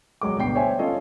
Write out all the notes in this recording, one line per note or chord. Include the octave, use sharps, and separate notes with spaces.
E1 F#3 G#3 D6
D2 G2 B2 G5 C7
C5 C#5 E5 G#5
C#4 F4 A4 C#5 D#5